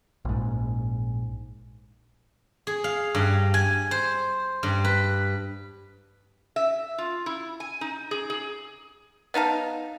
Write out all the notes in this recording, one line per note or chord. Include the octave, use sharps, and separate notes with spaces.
A#1 G#2
G#4
F5
G2
G#5
C5
G2
B4
E5
F4
E4
G#5
D#4
G#4
G#4
B3 D#4 F5 A5